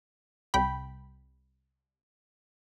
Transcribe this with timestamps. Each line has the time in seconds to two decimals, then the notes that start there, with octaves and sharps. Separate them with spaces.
0.54 C2 G5 B5